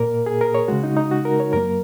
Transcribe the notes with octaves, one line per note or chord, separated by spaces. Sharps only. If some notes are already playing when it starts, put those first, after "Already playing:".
Already playing: A#2 A#3 A#4
G#4
A#4
C#5
C#3 G#3 F#4
D#4
D#4
F#4
A#4
C#5
F#2 F#3 A#3 A#4